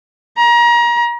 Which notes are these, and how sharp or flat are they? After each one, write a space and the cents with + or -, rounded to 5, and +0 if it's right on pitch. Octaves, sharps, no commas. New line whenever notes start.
A#5 +30